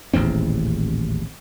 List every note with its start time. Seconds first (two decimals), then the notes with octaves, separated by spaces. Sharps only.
0.14 D#1 A1 E2 C4